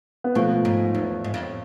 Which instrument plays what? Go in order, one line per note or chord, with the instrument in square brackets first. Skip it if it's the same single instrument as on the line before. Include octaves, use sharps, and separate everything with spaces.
[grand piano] B3
[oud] B2 [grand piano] F3 A3
[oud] G#2
E2
G#2
F2